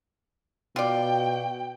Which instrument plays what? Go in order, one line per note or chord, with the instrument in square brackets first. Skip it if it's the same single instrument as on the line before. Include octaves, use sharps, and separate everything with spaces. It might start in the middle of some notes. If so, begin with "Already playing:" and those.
[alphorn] B2 [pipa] F4 D5 [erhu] G5